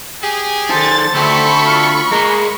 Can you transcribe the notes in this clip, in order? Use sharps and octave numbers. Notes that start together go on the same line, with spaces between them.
G4 G#4
D#3 A4 C5 A6
D2 A3 C4 A4 C5 B5 C#6
F4
G#3 A#3 A#5